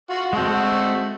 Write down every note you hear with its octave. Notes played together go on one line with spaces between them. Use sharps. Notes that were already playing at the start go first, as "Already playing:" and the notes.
F4 F#4
G#3 A3 C4 F#4